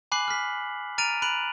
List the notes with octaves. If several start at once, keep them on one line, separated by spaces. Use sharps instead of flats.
G#5 B5 D6 F#6 C7 F#7
F6 B6
A#5 F6 A6 D7 D#7 F7
B5 F#6 D7 F7 F#7